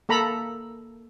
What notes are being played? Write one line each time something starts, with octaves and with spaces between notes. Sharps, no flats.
A#3 A4 A#5 B5